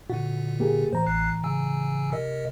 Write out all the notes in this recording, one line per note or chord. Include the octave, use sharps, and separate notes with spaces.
A#2 D3 F#4
A#3 G4 G#4
A2 E3 C5 A#5
A1 F#6 C7
C#3 G#5 E6
C3 A#4 D#5